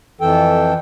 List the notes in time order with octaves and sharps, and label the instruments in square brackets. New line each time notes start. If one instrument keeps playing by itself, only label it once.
[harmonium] F2 E3 A4 G5